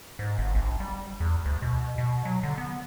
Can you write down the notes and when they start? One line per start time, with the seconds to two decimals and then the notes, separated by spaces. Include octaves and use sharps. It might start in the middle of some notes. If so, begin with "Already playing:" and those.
0.19 G#2
0.38 G1
0.55 A#1
0.80 G3
1.20 E2
1.46 D2
1.62 B2
1.98 B2
2.25 F#3
2.43 D3
2.58 B3